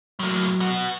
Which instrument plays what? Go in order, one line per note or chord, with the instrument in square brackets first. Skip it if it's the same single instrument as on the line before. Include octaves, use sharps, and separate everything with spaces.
[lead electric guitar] A2 A#3 [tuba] F#3
[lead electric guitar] B3 F#4